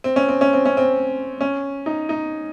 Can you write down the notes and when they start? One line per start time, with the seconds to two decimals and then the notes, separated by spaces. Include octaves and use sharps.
0.04 C4
0.16 C#4
0.28 C4
0.41 C#4
0.53 C4
0.66 C#4
0.77 C4
1.41 C#4
1.86 D#4
2.09 D#4